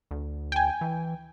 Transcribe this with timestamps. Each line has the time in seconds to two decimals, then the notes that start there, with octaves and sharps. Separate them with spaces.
0.11 D2
0.52 G5 G#5
0.81 E3